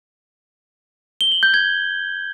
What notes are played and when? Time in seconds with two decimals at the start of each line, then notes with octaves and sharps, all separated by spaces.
1.21 G7
1.32 F#7
1.43 G6
1.54 G#6